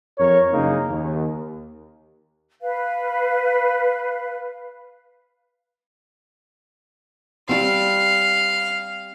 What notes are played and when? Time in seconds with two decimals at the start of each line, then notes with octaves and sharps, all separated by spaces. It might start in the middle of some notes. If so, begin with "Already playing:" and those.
0.17 F2 A#4 C#5
0.51 F#1 C#3 A#3 D#4
0.89 D#2
2.61 B4 F5
7.49 G3 C4 F5